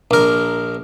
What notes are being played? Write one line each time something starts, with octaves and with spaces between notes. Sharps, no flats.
A#1 A#4